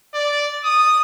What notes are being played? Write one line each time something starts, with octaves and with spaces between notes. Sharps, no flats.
D5
D#6